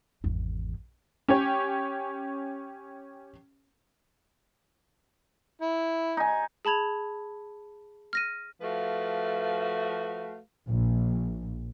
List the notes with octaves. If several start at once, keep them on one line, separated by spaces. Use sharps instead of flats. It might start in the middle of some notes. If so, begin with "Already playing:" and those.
G#1 E2
C#4 G4 C#5
E4
D#4 G#5
G#4 A5 B5 G#6 F7
F6 A#6 D#7
F3 A3 F#4 B4 F5
A#1